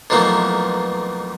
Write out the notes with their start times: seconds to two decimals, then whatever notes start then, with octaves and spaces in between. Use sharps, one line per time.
0.10 B1 F2 E3 A3 A#3